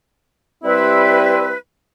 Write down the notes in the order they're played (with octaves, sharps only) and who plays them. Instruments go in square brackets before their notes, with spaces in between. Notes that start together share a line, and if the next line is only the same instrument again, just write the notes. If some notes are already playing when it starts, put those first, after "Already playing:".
[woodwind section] G3 C4 E4 [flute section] B4